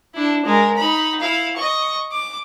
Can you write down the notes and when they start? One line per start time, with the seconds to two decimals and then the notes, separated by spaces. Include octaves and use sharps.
0.14 D4 E4
0.45 G#3 A#4
0.77 D#4 B5
1.20 E4 F5
1.56 D#5 C#6
2.12 D6